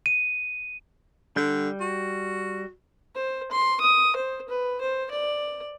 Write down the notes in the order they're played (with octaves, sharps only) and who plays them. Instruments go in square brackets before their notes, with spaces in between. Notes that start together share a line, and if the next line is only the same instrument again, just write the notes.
[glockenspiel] D#7
[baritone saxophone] D3 [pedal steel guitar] G3 G6
[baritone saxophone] F#4
[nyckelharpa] C5
C6
D#6
C5
B4
C5
D5